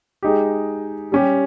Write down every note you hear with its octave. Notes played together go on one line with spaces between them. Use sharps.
G#3 D#4 G4
G3 C#4 G4